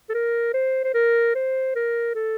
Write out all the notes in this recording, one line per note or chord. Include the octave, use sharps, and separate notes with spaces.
A4
A#4
C5
C5
A#4
C5
A#4
A4